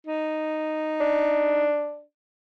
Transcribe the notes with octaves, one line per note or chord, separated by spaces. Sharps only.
D#4
D4